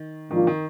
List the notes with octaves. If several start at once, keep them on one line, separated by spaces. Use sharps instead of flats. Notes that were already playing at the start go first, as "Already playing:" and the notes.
Already playing: D#3
G#2 D#3 F3 A#3 D4 F4
D#3